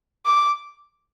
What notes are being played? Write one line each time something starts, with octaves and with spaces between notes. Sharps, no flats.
D6